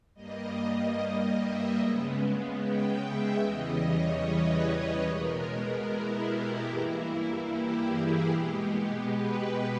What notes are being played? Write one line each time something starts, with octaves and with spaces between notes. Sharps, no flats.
G2 G3 A#3 D#5
E5
C#3 G#3 B3
G5
E5
E2 C#3 E3 G3 D#5
C#5
B4
B2 G#3 B3 A#4
E4
G4
G2 E3 A#3 E4
G4
G#4
B2 G#3 B3 G4
B4